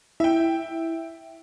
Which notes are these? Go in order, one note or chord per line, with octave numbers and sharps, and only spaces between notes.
E4 E5 G5